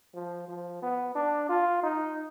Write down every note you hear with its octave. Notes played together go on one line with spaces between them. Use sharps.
F3
F3
B3
D4
F4
D#4